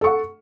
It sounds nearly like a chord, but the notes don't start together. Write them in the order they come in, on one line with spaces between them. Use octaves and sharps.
A4 C#6 F#5